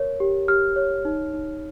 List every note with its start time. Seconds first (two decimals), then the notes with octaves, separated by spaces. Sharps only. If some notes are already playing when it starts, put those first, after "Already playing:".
Already playing: A#4 C#5
0.20 G4
0.48 G4 F6
0.76 C#5
1.05 D#4
1.34 D#4